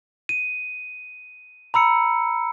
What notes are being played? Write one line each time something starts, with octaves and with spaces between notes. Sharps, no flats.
D#7
A#5 B5 E6 C#7